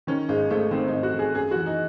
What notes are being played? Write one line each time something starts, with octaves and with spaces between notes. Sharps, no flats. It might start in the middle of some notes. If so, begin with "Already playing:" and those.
D#3 C#4
G#1 G#3
G#1 A3
D#3 C4
D#4
G#1
F#4
D#3
G#4
F#2 G#4
E3 F#4
D#4